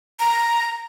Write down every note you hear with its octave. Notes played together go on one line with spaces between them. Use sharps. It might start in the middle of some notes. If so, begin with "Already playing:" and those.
A#5